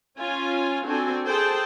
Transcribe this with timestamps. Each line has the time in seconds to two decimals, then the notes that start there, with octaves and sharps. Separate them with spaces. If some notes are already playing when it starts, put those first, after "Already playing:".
0.18 C#4 F4 G#5
0.86 C4 D4 F#4 A4 G#5
1.25 G#4 A4 C5 G5 A5